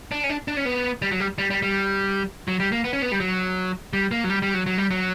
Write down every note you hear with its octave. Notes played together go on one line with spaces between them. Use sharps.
D4
C#4
D4
D4
C#4
B3
G3
F#3
G3
G3
G3
G3
F#3
G3
A#3
B3
C#4
B3
G3
F#3
G3
A#3
F#3
G3
G3
F#3
F#3
G3
F#3